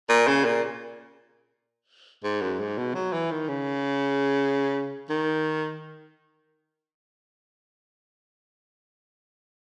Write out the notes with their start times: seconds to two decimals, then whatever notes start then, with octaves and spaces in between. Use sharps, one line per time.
0.09 A#2
0.28 C#3
0.45 A#2
2.24 G#2
2.42 F#2
2.60 G#2
2.77 B2
2.95 F#3
3.13 E3
3.31 D#3
3.48 C#3
5.10 D#3